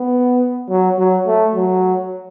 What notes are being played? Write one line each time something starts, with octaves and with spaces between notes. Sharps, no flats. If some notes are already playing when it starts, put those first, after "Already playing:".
Already playing: B3
F#3
F#3
A3
F#3